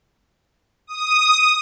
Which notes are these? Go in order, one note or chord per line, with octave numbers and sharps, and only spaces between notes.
D#6